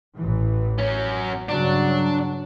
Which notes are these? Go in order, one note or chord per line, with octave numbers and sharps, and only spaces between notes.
A1 E3
F#3 C#4
G2 C#3 F#3 D4